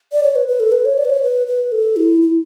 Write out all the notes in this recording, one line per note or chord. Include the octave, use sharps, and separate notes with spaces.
D5
C#5
B4
B4
A4
B4
C#5
D5
B4
C#5
B4
B4
A4
E4
E4